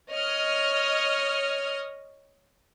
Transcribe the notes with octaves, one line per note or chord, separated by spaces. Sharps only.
C#5 D#5 F6